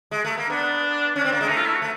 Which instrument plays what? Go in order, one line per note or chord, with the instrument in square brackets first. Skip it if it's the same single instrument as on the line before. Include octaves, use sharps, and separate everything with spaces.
[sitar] G#3
A3
A#3
[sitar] B3 [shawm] D4
[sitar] C#4 [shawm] D4
[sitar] C4
A#3
G#3
[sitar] A3 [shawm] D#4
[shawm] F4
E4
F#4
[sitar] A3